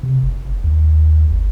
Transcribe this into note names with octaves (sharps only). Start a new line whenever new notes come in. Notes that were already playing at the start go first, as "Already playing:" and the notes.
C3
F#1
D#2
G1